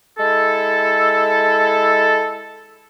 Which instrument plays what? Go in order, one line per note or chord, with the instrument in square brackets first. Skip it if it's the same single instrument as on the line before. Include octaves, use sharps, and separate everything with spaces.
[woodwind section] G#3 E4 A4